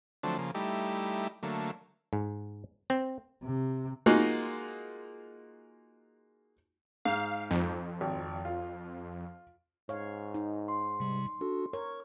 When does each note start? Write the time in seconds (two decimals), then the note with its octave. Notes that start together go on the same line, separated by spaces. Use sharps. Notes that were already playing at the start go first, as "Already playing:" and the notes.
0.23 D3 F3 F#3 A3 C4 D4
0.38 C#3 F3 A#3
0.55 G3 A3 D#4 E4 G4
1.43 D3 F#3 A3 A#3
2.13 G#2
2.90 C4
3.42 C3
4.06 G#3 A#3 D#4 F4 F#4 G#4
7.05 G#2 F5
7.51 F2
8.01 G#1
8.45 F4
9.89 G#2 C#5 F5
10.34 D#4
10.68 C6
11.00 C3 G3
11.41 D4 F#4 A4
11.73 A#4 C#5 C#6